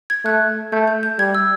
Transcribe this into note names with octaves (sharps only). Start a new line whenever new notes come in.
G#6
A3 F#6
A3 G6
G6
G6
G3 G#6
E6